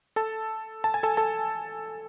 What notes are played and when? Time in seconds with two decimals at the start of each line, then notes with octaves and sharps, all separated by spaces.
0.16 A4 A5
0.84 A5
0.94 G#5
1.03 A4 A5
1.17 A4 A5